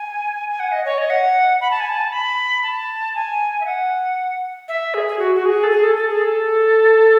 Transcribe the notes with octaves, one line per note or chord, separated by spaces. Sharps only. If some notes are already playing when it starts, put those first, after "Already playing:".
Already playing: G#5
G#5
F#5
D#5
C#5
D#5
F#5
B5
A5
G#5
A5
B5
A5
G#5
E5
F#5
E5
G#4
G#4
F#4
F#4
G#4
A4
G#4
A4
A4
G#4
A4